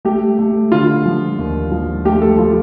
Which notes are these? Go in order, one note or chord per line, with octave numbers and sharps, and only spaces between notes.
A3 G4
A3
D3 F4
F3
D#2
F3
A3 G4
A4
F3 F4